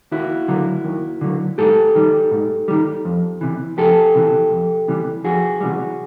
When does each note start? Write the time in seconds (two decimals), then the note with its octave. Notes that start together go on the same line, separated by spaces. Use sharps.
0.12 D#2 E4 F#4
0.48 D3 F#3
0.84 D#2
1.21 D3 F#3
1.58 G#2 G4 A4
1.95 D#3 G3
2.31 G#2
2.68 D#3 G3
3.05 F2
3.41 C3 E3
3.78 F2 G4 A4
4.15 C3 E3
4.51 F2
4.88 C3 E3 G3
5.24 F2 F#4 G#4
5.60 C3 E3 G3